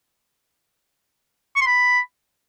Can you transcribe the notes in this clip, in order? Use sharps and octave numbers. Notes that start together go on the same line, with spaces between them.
C#6
C6
B5